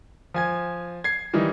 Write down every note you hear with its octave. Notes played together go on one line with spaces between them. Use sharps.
F3 G#5 G#6
G#6 C7
D#3 E3 G3 D#4